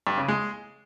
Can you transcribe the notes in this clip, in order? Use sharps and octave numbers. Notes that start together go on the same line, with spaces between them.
G2
C#3
G#3